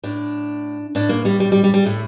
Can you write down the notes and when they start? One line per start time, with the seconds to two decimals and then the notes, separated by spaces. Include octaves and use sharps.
0.03 A2 D4
0.95 A2 D4
1.09 A#3
1.25 G3
1.40 G3
1.52 G3
1.64 G3
1.74 G3
1.86 A2 A3